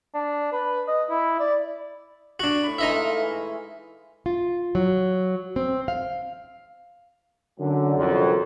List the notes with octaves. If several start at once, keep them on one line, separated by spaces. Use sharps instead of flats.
D4
B4
D#5
E4
D5
D4 F#4
A2 B5
E3 G#3 A3 D#4 D#5 E5
F5
E3
F4
F#3
C4
F5
F#2 D3
C2 F2